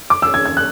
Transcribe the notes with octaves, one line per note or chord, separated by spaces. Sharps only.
D6
E6
G#6
G#6
F#6